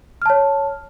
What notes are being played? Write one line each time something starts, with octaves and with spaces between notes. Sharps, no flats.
C#5 A5 F6